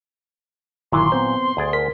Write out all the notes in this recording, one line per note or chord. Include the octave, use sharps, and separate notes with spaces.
G1 A#2 D#3 F#3 E4 C6
B3 C4 C5
D2 G#4 D5
A#4 B6